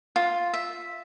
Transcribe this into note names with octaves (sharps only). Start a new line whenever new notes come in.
F4
E5